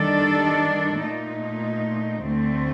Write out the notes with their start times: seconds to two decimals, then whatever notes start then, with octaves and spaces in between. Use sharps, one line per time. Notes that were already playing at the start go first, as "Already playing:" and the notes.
Already playing: D#3 G3 D4 A4 D5
0.98 A#2 A3 D#4
2.24 D2 D3 A3 C4